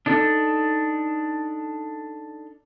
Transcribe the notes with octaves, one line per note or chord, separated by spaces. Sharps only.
D4 D#4 A4